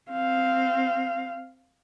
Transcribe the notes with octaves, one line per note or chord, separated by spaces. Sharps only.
C4 F5